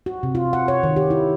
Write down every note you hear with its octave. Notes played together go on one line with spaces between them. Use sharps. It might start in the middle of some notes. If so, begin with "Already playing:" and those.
F#4
C3
F4
F#5
C#5
D#3
G4
E4